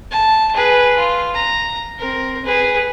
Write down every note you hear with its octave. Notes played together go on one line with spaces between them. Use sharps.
A5
G#4 B4
F4
A#5
C4 A#4
G#4 B4